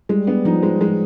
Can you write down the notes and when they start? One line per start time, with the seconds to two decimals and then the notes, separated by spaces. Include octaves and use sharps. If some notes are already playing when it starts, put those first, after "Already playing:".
0.09 G3 G#3
0.27 B3
0.45 F3 D#4
0.63 G#3
0.81 F3 G#3